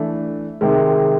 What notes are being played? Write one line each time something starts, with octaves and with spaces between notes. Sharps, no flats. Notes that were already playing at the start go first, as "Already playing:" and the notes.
Already playing: E3 A3 D4
C3 D#3 G#3